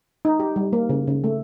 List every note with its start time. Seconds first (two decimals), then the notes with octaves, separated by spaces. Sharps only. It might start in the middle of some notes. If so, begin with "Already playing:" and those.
0.25 D#4
0.40 G4
0.56 G3
0.73 A#3
0.89 C#3
1.07 C#3
1.24 A3